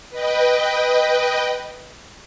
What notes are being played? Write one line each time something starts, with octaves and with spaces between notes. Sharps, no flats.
B4 D#5 G5